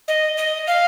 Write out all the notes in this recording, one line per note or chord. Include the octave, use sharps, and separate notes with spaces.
D#5
D#5
F5